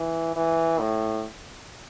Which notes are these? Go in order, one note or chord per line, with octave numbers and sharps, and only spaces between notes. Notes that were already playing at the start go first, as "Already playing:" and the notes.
Already playing: E3
E3
A2